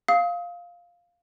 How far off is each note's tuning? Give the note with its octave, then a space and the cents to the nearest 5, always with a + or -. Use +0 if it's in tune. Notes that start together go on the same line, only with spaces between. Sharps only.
F5 +0 D#6 +35